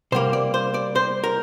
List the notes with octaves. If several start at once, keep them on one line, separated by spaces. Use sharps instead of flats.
C3 G3 A#3 C5
D5
C5
D5
C5
A#4